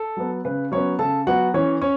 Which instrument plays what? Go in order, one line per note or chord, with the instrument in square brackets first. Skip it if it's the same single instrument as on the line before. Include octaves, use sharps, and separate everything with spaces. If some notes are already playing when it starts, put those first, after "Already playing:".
Already playing: [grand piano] A4
F#3 B3
C#3 B4
F#3 B3 C#4 C#5
C#3 A4 A5
F#3 B3 F#4 F#5
E3 C#4 C#5
C#4 C#5